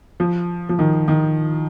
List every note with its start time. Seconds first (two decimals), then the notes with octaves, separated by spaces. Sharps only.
0.20 F3
0.69 F3
0.79 D#3
1.08 D#3